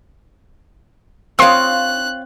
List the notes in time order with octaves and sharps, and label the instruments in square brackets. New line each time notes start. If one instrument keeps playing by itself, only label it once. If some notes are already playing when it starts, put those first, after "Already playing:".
[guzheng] C4 C#5 [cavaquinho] F4 F5 [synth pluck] C6 D#6 [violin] F#6